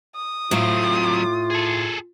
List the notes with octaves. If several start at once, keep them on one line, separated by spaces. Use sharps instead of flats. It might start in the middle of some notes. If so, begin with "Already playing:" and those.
D#6
A2 F#3 C4 F4 F5
G#4 A4